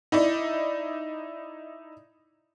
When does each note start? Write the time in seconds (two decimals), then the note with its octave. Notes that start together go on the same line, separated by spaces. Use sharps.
0.12 D#4 E4 D5